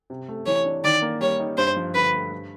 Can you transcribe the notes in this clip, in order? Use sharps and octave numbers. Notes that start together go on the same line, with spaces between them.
C3
A3
E3 C#5
D4
D#3 D5
A#3
G3 C#5
D#4
G2 C5
F3
D3 B4
A3
G2